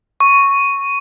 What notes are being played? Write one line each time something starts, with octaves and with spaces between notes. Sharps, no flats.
C#6